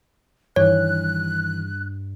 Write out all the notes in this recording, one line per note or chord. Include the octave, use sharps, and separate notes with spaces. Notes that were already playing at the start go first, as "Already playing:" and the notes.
G2 D#3 E3 C#5 F#6